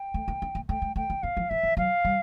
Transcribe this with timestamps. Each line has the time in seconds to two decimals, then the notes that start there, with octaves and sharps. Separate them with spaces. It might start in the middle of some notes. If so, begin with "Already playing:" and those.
Already playing: G5
0.14 A3
0.28 A#3
0.42 C#4
0.55 A#3
0.69 A3 G5
0.82 G#3
0.96 A3 G5
1.10 A#3
1.23 B3 F5
1.37 F3
1.50 E3 E5
1.63 F3
1.77 F#3 F5
2.05 G3